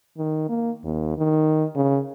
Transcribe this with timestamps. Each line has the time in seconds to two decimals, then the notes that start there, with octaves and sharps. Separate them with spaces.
0.18 D#3
0.49 A#3
0.84 D#2
1.18 D#3
1.76 C#3